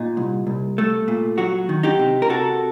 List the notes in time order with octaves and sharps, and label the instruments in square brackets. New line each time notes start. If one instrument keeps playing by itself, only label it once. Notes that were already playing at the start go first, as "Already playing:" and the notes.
Already playing: [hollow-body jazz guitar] A#2 D#4
C2
C2
A3
A#2
F#3 F#4
D#3
D#4 G4
C3
A#4
C3 F#4 A4